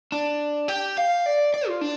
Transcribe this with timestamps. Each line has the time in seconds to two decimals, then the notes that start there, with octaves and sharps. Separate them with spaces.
0.12 D4
0.68 G4
0.98 F5
1.26 D5
1.54 D5
1.68 F4
1.81 D4